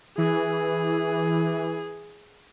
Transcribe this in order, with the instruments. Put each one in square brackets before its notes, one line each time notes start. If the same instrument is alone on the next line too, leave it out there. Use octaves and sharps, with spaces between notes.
[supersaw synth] E3 [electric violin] G#4